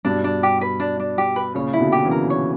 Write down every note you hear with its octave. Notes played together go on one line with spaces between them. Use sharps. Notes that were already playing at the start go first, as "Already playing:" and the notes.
G2 B2 D4
D4
G4
B4
D4
D4
G4
B4
A#2 C#3 C#5
E4
B2 D3
G4
C#3 E3
A#4
C#5